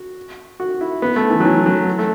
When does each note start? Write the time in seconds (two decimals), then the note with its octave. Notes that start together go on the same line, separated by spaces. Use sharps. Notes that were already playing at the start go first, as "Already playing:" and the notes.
Already playing: F#4
0.60 F#4
0.81 E4
1.02 B3
1.16 A3
1.30 E3
1.40 F#3
1.45 E3
1.66 F#3
1.99 A3